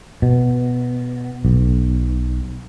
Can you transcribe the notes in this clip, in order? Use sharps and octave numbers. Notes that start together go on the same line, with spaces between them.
B2
B1